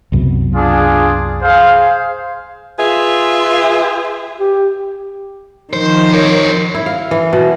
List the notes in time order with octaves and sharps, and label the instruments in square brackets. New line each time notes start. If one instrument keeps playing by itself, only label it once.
[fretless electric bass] C2 F#2 B2
[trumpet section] D4 F4 G#4
G#4 C5 F5
[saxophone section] F4 G#4 B4 E5
[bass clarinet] G4
[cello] D#3 F3 [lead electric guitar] C5
[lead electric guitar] A#4 C#5
[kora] E4
F5
E3
B2